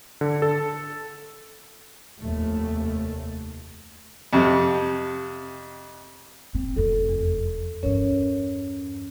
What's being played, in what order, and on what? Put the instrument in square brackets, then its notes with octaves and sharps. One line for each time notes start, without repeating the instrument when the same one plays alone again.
[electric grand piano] D3
A4
[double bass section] F1 D#2 A3
[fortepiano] F2 C3
[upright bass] C4
[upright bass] F1 F2 [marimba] A4
[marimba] E2
[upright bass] G2 E3 [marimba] C#4 A#4 C#5